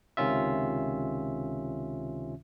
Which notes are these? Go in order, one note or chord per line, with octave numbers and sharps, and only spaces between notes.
C#2 C3 D#3 C#4 F4 E5